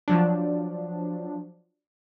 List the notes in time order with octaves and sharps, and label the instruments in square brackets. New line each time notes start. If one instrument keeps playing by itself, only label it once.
[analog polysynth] F3 F#3 D4